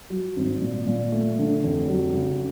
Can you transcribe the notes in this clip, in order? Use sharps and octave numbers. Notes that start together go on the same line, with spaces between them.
F#3
G#1
A#2
A#2
A3
D3
F1
F#3
C#3